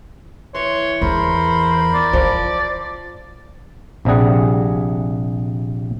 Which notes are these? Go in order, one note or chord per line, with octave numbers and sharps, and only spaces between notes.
E3 C#5 C6
E2 A#4 C5 B5
D5
F3 F4
A#1 C3 G3 G#4 F#5